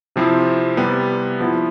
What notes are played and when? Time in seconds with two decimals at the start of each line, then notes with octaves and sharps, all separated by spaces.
0.16 C3 F3 C4 E4
0.77 C3 G3 B3
1.40 F3 B3 E4